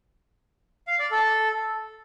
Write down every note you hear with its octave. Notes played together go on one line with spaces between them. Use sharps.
F5
D5
A4